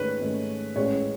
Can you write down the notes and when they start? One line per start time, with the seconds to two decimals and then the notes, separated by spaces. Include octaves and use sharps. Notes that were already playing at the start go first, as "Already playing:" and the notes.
Already playing: G#2 D#3 A3 C#4 B4 C#5
0.21 G#2 D#3 A3 C#4
0.76 A1 A2 G#3 C#4 C#5